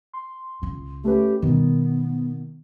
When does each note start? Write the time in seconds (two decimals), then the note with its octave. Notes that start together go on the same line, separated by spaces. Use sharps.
0.13 C6
0.62 C#2 C#3
1.04 A3 C#4 G4 B4
1.42 B2 D#3 G3 B3